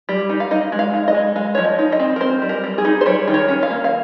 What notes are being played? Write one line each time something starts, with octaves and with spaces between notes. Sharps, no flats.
G3
D#4
F5
D#4 D#5
G#3
F5
D#4
D#5
G#3
G#3 F5
F3 C#5
D#5
D#4
D#5
C4
A#4
C4 C5
G3
A#4
G3
G#4
D#4
C5
G3 C#5
D#3
C#5
C#4
F5
A#3
F5